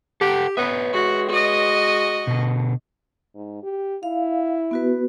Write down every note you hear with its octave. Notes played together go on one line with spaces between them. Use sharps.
G4 A4 F#5 G5
B3 B4 C#5 E5
G#3 F#4
F#4 D#5
B2 D3
G#2
G4
E4 F5
B3 F#4 B4